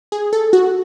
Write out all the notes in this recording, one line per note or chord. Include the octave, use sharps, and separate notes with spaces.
G#4
A4
F#4